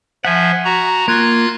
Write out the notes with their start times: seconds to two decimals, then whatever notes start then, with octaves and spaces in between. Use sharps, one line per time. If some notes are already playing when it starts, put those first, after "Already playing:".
0.25 F3 E5 F#5 G#5
0.65 F#4 A#5
1.08 A#3 F4 F#6 G#6